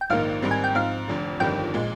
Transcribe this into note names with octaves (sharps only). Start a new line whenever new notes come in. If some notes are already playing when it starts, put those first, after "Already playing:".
G5
A#1 G#2 D#3 A#3 F5
G#2 D#3 G3 C4
G#5
G5
G#2 F3 C4 F5
F1 F2 D3
G1 F2 D#3 G3 D4 G5
A#2 G#3